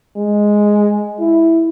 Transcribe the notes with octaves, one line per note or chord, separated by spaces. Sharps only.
G#3
E4